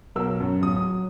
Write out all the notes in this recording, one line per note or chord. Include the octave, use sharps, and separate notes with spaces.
B1 F#3 A#4 E6
F#2
D1 D#6
D#6